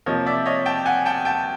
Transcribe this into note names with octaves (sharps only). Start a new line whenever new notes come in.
C3 F3 A#3 C#5 D#5
D5 E5
C#5 D#5
G5 A5
F#5 G#5
G5 A5
G5 A5